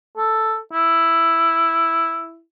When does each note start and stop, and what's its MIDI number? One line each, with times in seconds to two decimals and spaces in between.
0.17 0.58 69
0.72 2.41 64